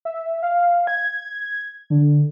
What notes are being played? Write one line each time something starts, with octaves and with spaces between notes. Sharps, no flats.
E5
F5
G#6
D3